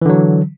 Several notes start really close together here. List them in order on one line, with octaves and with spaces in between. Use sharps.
E3 D3 F#3